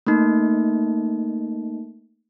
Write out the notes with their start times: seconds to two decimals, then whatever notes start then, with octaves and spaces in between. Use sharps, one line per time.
0.07 A3 A#3 D#4